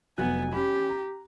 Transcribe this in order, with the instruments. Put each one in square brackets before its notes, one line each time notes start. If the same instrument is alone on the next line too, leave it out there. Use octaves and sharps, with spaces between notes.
[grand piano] F1 F#3 F#6 [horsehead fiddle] B3 G#5
[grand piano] C#4 B5 [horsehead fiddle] G4
[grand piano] A#5